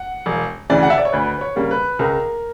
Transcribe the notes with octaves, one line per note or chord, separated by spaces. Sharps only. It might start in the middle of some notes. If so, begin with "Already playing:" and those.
Already playing: F#5
E1
D2 C#3 E3 D5
F#5
E5
D5
C#5
D2 B4
B4
C#5
C#3 G3 A#3
B4
C#2 A#4